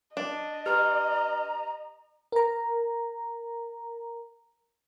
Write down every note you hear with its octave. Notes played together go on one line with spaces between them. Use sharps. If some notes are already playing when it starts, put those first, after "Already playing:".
D4 D#5
G4 B4 A#5 F6
A#4 A#5